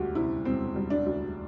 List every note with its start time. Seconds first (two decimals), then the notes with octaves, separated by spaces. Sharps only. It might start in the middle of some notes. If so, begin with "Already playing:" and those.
Already playing: E1 D2 G3 F#4 G4
0.15 C3 E4
0.45 E1 C4
0.76 G3
0.90 D4
1.06 D2